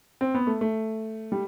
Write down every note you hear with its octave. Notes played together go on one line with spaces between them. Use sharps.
C4
B3
A3
A3
G3